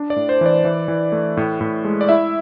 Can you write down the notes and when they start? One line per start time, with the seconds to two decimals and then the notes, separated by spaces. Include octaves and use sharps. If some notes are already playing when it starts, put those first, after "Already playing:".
Already playing: D4
0.10 D5
0.16 A2
0.29 C5
0.41 E3 D5
0.65 E3
0.88 E3
1.12 A3
1.37 A2
1.61 A2
1.85 G#3
2.01 D5
2.09 E4 E5